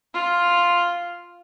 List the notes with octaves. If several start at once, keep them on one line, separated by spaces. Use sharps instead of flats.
F4